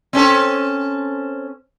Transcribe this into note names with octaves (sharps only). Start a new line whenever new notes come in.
C4 C#4 A4